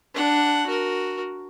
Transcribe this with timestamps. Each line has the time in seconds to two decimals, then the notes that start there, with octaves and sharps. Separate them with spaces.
0.14 D4 F#5
0.66 F#4 A#4